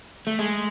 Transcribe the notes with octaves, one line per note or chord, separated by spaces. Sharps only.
A3
G#3